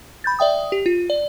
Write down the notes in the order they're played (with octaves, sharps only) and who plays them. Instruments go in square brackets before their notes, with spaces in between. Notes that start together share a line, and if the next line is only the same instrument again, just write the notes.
[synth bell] B5 G6 A6
D5 E5 G5 D#6
G4
F4
D5